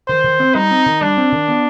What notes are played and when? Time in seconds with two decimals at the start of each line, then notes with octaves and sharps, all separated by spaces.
0.08 D#3 C5
0.24 D#3
0.40 C4
0.55 G3 D#4
0.71 C4
0.86 D#3
1.01 G3 D4
1.17 C4
1.32 D#3
1.48 B3